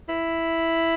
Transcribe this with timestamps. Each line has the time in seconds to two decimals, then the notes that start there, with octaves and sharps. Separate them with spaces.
0.09 E4